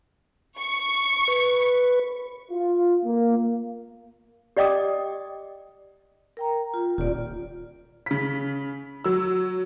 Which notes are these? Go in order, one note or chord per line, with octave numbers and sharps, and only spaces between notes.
C#6
B4
F4
A#3
G4 D5 D#5 G5 D6 D#6
A#4 G5 A#5
F4
D#1 F4 D5
C#3 B6
F#3 E6